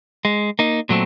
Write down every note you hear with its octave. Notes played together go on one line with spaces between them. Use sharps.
G#3
A#3 D#4
A#2 F#3 A3 C4